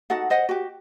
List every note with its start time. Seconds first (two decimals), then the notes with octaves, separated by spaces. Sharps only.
0.10 D#4 F#4 A4 F#5
0.30 C5 D#5 F#5
0.49 F#4 G4